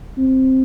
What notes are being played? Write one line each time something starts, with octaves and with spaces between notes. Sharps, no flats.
C4